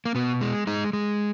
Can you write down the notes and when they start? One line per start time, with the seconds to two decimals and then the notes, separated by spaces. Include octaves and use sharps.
0.05 A#3
0.15 B2 B3
0.41 G#3
0.67 G#3 D#4
0.93 G#3